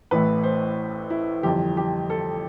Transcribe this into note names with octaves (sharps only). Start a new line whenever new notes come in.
A1 A2 E3 A3 B4
C5
E4
G1 F2 E3 G4
G4
A4